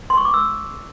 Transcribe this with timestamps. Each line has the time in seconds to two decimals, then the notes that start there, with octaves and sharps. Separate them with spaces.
0.10 C6
0.18 C#6
0.25 D6
0.34 E6